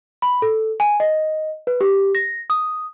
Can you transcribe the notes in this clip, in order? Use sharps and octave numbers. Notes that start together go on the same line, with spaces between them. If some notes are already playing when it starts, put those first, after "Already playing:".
B5
A4
G#5
D#5
B4
G4
A#6
D#6